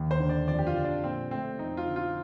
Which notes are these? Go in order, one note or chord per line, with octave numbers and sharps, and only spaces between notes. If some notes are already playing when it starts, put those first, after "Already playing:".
Already playing: D#2
C5
D3
D5
F2 D5
G4
F4
D3
D4
A#2 C4
A3 C4
F2 D#4
F4
D3
F4